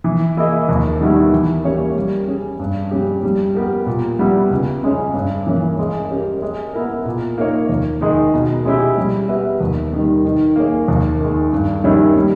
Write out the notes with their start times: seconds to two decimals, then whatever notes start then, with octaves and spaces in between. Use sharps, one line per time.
0.04 E3
0.37 A#3 E4 G#4 D#5
0.69 D#2
1.00 D#3 G3 B3 E4
1.32 E3
1.64 A#3 C#4 G4 C#5
1.96 G3
2.28 C#4 G#4
2.59 G2
2.91 G3 C#4 G4
3.23 G3
3.55 B3 G4 A#4
3.87 A#2
4.19 G3 B3 E4
4.51 C#2
4.83 C#3 G#3 C#4
5.14 G2
5.47 E3 A#3 C#4
5.79 G#3
6.10 C#4 G4 A#4
6.42 G#3
6.73 B3 E4 A#4
7.06 A#2
7.38 A#3 D#4 A#4 C#5
7.69 D#2
8.01 D#3 G#3 D#4
8.34 B2
8.65 G#3 C#4 E4 G4
8.97 G3
9.28 B3 G4 B4 E5
9.61 D#2
9.93 D#3 G3
10.25 D#3
10.56 A#3 D#4 G#4 C#5
10.88 D#2
11.20 D#3 G#3
11.52 G2
11.84 D#3 G3 C#4 E4
12.16 G3